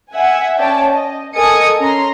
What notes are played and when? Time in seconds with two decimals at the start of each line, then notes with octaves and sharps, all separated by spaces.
0.12 E5 F#5 G#5
0.58 C#4 C#5 D5 G5 A5
0.92 D#5
1.35 A4 A#4 D#5 G#5 D#6 C#7
1.79 C#4 A#5 C6